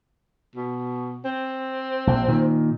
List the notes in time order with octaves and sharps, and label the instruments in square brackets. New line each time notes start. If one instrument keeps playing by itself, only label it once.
[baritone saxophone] B2
C4
[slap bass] A#1
A#2 D#3